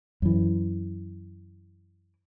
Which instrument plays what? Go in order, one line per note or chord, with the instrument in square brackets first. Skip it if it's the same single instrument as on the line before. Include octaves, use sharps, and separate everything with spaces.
[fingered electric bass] F#2 E3